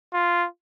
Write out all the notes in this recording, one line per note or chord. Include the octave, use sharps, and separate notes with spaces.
F4